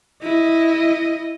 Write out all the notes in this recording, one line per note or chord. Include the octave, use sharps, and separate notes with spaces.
E4 D#5